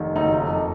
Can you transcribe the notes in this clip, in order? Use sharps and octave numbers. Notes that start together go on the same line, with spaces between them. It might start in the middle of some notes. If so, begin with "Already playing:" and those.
Already playing: F1 D#3
F#1 D#4
F2